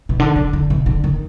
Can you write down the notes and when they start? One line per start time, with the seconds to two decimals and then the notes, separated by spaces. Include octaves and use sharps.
0.09 B2
0.20 D3
0.36 D3
0.53 D3
0.70 B2
0.86 D3
1.04 D#3